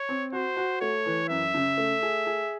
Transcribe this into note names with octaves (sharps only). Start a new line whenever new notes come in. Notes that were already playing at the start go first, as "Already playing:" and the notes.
Already playing: C#5
C4
F#4 C5
F#4
A3 C#5
E3
F#2 E5
C#3
A3
G#4
G#4